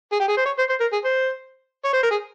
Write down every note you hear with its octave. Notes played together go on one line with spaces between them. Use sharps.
G#4
G4
G#4
C5
C#5
C5
C5
A#4
G#4
C5
C#5
C5
A#4
G#4